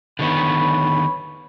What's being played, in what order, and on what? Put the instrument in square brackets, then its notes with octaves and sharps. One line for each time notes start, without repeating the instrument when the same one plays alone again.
[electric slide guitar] D3 D#3 B3 [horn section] C#5 B5